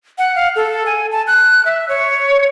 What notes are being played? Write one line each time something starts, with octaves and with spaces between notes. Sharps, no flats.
F#5
F5
A4
G#5
A5
F#6
E5
C#5